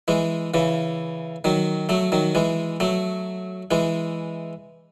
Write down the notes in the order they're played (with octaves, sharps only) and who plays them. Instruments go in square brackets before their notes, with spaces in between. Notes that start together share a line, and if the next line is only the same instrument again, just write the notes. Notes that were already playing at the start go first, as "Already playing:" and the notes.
[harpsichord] E3 G#3
C#3 E3
D#3 F#3
F#3 A3
D#3 F#3
E3 G#3
F#3 A3
E3 G#3